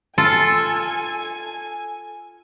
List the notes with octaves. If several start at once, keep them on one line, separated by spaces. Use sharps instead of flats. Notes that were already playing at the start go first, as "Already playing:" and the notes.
F4 A4 G#5